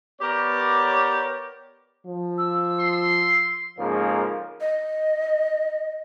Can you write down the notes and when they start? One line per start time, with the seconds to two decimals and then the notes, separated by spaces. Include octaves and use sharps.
0.21 B3 G4 A#4 C#5 D5
2.06 F3
2.38 E6
2.80 C6
3.78 F2 G#2 C#3 F3 A#3
4.61 D#5